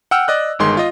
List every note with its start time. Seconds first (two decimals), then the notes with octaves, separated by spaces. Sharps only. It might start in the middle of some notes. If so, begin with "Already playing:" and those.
0.11 F#5 G5 E6 F6
0.28 D5 D#5 F#6
0.59 G1 D#3 G#3 C6
0.77 F4 D#5